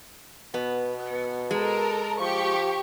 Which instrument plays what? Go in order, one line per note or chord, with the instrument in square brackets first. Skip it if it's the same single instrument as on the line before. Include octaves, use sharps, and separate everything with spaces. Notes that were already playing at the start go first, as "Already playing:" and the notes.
[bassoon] B2 [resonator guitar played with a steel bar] B3
[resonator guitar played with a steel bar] G#3 [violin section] A4 A#4
[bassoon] F3 [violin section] G4 C#6